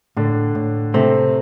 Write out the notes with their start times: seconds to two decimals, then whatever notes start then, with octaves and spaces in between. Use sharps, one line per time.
0.17 A2 D3 D4
0.55 A2
0.94 C3 A3 C4